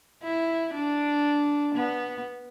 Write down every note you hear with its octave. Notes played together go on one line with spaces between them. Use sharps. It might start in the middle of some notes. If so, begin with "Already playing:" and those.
E4
D4
B3